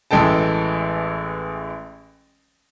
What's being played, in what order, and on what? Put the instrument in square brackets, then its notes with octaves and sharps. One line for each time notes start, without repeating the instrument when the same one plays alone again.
[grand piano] A1 E3 G#3 A4 G5 A5